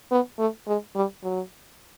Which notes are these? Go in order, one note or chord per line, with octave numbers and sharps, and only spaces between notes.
B3
A3
G#3
G3
F#3